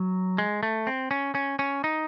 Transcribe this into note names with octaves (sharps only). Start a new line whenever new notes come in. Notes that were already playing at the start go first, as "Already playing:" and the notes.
Already playing: F#3
G#3
A3
C4
C#4
C#4
C#4
D#4